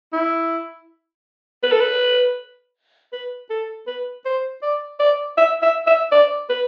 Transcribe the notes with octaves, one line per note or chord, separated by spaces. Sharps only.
E4
B4
A4
B4
B4
A4
B4
C5
D5
D5
E5
E5
E5
D5
B4